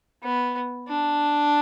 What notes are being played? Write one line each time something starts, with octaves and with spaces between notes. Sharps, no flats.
B3
D4